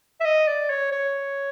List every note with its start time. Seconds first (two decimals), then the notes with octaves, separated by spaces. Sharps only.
0.20 E5
0.25 D#5
0.47 D5
0.70 C#5
0.92 C#5